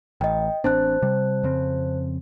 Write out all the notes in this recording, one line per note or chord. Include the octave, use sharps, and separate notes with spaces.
A1 D#5 G5
A1 C4 D4 C5 A5 F#6
C3 G3
F2 C#3 C4